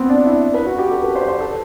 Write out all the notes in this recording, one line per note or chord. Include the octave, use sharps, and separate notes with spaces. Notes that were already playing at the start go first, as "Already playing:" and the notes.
Already playing: B3 C4
D4
E4
B4
F#4
G4
A4
B4
C5
C5
A4